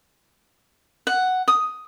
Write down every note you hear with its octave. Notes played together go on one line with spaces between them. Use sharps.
F#5
D#6